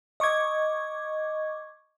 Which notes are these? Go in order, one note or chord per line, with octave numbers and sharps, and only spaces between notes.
D#5 C#6 D6 G#6